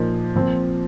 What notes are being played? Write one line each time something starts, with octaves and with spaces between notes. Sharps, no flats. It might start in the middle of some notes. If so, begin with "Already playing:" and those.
Already playing: A#2 F3 A#3 D#4
A#2 F3 C4 F4